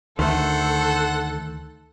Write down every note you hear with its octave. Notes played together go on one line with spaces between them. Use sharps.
D2 D#3 A3 A4 C5 F#5